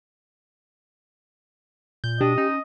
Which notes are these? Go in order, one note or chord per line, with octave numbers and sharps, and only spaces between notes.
A#2 G6
B2 D4 G4 D#5
C#4 D#4